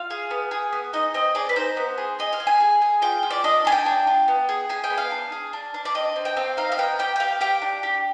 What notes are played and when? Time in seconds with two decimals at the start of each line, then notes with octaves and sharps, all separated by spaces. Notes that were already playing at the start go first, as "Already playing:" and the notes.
Already playing: F4 F5
0.10 G#4
0.31 B3
0.51 G#4
0.73 B3
0.93 D#4 D#5
1.14 C4 D#5
1.35 G#4 D5
1.49 B4
1.56 D#4 C5
1.77 B3
1.98 G#4
2.19 G#4 D#5
2.33 F5
2.40 G#4
2.47 G#5
2.60 G#4
2.82 G#4
3.02 F4 G5
3.23 F4
3.31 D5
3.44 D4 D#5
3.65 D4 G#5
3.72 G5
3.86 D4
4.07 F4
4.28 B3
4.49 G#4
4.69 G#4 G#5
4.84 G5
4.90 B3
4.98 F5
5.11 D4
5.32 G#4
5.53 D4
5.74 D4
5.85 D5
5.94 C4 D#5
6.16 C4
6.25 G5
6.37 C4 F5
6.57 D#4 F5
6.72 F5
6.78 B3 G5
6.99 G4 G5
7.16 G5
7.20 G4 F5
7.41 G4 G5
7.62 D4
7.83 G4